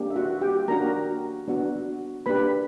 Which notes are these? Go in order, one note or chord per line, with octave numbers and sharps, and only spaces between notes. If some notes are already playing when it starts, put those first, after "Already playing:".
Already playing: A#3 D4 G4
E5
F#4 F#5
G4 G5
A#3 D4 F#4 A#4 A#5
B3 D4 F#4
A#3 D4 G4 B4 B5